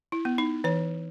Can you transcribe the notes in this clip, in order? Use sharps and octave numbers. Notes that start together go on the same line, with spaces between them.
E4
B3
D#4
E3 C#5